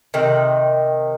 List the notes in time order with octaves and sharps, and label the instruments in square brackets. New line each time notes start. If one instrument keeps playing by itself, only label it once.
[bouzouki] C3 D#3